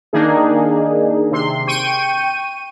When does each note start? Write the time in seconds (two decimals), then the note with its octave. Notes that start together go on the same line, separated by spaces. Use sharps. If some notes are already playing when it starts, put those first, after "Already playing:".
0.13 D#3 A#3 D4 D#4 G#4
1.31 C3 C6
1.67 G5 C#6 D#7